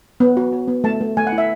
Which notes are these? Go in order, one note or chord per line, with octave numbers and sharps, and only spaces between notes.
B3
F#4
F#4
B3
A3 A5
A3
A3 G#5
F#5
E4
E5